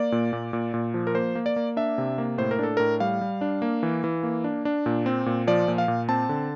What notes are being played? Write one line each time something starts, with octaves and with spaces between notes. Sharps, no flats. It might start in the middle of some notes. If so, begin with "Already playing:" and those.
Already playing: A#3 D5
A#2
A#2
A#2
A#2
F3
A#4
A#3 C5
A#3
D5
A#3
D4 E5
C3
A#3
A2 C5
A#4
D4 A4
A2 A#4
G3 F5
G3
D4
A#3
E3
E3
A#3
D4
D4
A#2
C4
A#2
F3 D5
A#2
F5
A#2
C4 A5
D3